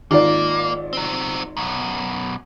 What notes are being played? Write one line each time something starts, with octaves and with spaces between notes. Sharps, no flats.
G#1 A#3 F4 D5
F#3 C4
F#2 B2